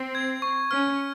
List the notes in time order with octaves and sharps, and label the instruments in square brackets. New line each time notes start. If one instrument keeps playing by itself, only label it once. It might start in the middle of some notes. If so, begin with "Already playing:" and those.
Already playing: [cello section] C4
[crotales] G#6
C#6
[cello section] C#4 [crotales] F6